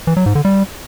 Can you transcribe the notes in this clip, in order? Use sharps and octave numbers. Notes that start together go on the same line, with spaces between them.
E3
F#3
G#2
D3
G3